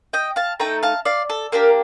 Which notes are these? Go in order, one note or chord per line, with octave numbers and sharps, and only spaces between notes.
D#5 G5
F5 A5
A3 D#4 A4 G5 A#5
F5 A5
D5 F5
A4
A#3 D4 G4 A#4